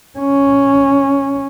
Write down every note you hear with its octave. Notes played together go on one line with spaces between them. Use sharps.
C#4